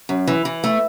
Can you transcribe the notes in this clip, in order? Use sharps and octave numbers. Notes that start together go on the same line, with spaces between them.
F#2
E3
E3
A3